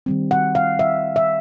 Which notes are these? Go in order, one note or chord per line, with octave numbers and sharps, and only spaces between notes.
D#3 G3 C4
F#5
F5
E5
E5